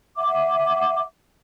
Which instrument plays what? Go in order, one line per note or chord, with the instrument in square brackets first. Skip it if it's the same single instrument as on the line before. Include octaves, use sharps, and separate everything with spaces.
[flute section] E5 F#5 D6